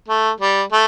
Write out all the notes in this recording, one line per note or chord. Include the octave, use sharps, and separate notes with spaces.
A3
G3
A3